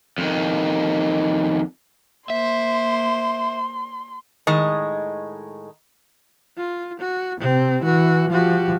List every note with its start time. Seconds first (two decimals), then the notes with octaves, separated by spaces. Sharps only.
0.18 F2 D#3
2.30 A#3 C5 E5 C6
4.47 A2 D#3 G#3 D#5
6.57 F4
6.99 F#4
7.40 C3 C4
7.84 E3 F#4
8.32 F3 F#4 G4